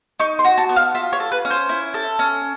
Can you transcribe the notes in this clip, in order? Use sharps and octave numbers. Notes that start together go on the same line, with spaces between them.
D#4 C#6
C6
F#4
A5
B3
F5
F4 E5
C#5
A4
B4
C#4
C5
E4
A4
C#4